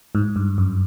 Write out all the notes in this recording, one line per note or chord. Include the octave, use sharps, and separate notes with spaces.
G#2
G2
F#2